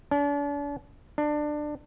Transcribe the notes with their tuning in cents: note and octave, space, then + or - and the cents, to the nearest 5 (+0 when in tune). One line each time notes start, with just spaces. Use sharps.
D4 -40
D4 +20